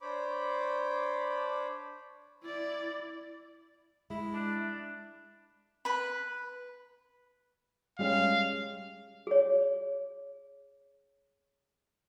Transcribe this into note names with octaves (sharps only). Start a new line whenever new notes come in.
D4 C5 C#5 B5 D6
E4 D5
G#3 E4
D4
B4 B5
G3 G#3 C#4 F5
G#4 C#5